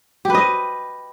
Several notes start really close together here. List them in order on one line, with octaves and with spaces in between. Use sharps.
G4 B4 D#5